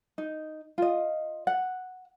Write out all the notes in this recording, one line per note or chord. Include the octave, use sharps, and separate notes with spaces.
D#4
F4 D#5
F#5